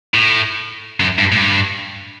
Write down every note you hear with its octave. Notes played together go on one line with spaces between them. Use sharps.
A2
F#2
G2
A2
G2